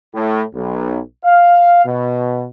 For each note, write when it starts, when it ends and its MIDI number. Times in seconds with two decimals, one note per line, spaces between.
0.14 0.42 45
0.55 0.99 35
1.25 1.83 77
1.85 2.45 47